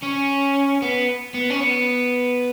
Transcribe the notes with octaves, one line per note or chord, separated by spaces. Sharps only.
C#4
B3
B3
C#4
B3